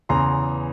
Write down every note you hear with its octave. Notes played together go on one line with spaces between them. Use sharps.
E2 C#3 E3 A#5 C6